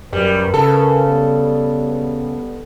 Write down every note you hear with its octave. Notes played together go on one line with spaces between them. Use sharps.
F#2 G3 A#4 B4
C#3 A4
G3 B3